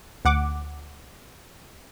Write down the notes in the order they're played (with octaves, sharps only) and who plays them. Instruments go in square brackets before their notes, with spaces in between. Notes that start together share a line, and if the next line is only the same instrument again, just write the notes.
[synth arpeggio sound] D2 F#5 D6